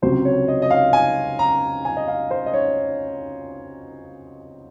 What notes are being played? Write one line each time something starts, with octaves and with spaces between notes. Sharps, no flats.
C#2 C3 F#3 C5
C#5
D#5
D#5
F5
G#5
A#5
G#5
D#5
F5
C5
D#5
C#5